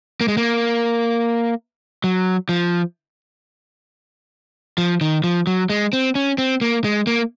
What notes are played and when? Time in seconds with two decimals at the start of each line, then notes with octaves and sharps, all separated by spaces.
0.21 A#3
0.28 G#3
0.37 A#3
2.04 F#3
2.49 F3
4.78 F3
5.01 D#3
5.24 F3
5.47 F#3
5.70 G#3
5.93 C4
6.15 C#4
6.38 C4
6.61 A#3
6.84 G#3
7.07 A#3